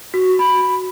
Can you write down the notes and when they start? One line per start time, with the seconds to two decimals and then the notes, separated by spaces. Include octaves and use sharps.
0.14 F#4
0.39 B5